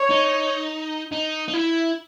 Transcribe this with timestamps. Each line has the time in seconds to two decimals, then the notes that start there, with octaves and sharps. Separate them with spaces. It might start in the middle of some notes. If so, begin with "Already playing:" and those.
Already playing: C#5
0.10 D#4
1.12 D#4
1.48 D#4
1.53 E4